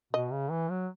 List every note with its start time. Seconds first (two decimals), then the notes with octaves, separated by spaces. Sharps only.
0.13 B2 D#5
0.32 C#3
0.51 E3
0.71 F#3